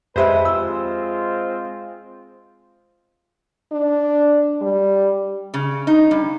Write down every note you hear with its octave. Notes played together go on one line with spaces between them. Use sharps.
F2 C3 G#3 G4 B4 C5 E5
G#3 C4 F4 E6
D4
G3
C#3
D#4
G2